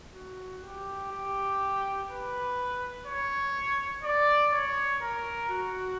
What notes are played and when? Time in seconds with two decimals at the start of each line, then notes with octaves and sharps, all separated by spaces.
0.13 F#4
0.63 G4
1.11 G4
2.08 B4
3.06 C#5
4.03 D5
4.52 C#5
5.01 A#4
5.50 F#4